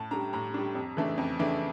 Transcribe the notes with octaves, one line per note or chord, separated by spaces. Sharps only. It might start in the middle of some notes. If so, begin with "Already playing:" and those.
Already playing: A2 A5
G3 D4 A#5
A2 A#5
G3 D4
F2
C#3 E3 A3 D4
F2
C#3 E3 A3 D4